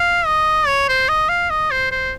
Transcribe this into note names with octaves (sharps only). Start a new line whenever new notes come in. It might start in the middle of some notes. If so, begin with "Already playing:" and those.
Already playing: F5
D#5
C#5
C5
D#5
F5
D#5
C5
C5